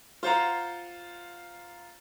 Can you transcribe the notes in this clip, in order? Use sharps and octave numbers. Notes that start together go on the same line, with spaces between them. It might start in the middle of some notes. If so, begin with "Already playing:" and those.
F4 C5 F#5 A#5